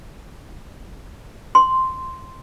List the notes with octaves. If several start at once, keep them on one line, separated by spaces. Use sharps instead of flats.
C6